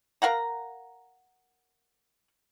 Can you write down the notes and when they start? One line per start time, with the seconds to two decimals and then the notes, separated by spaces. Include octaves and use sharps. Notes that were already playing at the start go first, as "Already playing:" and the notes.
0.22 A#4 F5 F#5 A#5